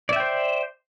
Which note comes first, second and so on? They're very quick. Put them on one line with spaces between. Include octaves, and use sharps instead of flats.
D5 E5 G5 C5